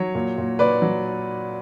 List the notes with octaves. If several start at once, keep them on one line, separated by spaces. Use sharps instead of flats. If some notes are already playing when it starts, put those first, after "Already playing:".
Already playing: F#3 C#5
A#2
A#2
A#2 B4 D5
F#3